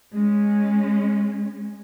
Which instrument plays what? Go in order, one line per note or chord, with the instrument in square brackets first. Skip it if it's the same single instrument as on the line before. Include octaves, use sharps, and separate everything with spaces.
[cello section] G#3 C#4